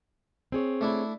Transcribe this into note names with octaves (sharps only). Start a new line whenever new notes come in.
C4 G#4 C#5
A3 D4 E4